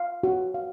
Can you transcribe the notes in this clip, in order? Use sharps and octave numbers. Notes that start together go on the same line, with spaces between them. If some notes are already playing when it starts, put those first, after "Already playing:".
Already playing: F5
F#4
F5